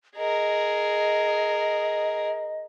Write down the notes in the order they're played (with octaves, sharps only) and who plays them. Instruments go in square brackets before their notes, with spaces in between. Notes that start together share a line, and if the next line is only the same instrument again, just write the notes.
[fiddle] G#4 A#4 [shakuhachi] D#5